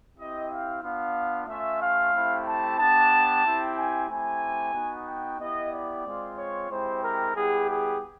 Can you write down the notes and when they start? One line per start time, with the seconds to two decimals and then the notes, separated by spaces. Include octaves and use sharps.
0.17 C4 E4 G4 D#5
0.50 F5
0.82 B3 D4 F4 F5
1.47 A3 C#4 F4 E5
1.80 F5
2.13 A3 C4 E4 G4
2.46 A5
2.78 B3 D4 G4 A5
3.43 C4 E4 G4
3.77 G#5
4.09 A3 C4 E4 G4 G#5
4.74 B3 D#4 F#4
5.06 G5
5.39 B3 E4 G4 D#5
5.72 D5
6.05 G#3 C4 F4
6.37 C#5
6.69 G#3 C4 E4 G4 C5
7.03 A#4
7.35 G3 B3 E4 G4 G#4
7.68 G#4